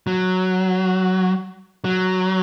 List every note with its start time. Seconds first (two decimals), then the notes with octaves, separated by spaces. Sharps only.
0.07 F#3
1.85 F#3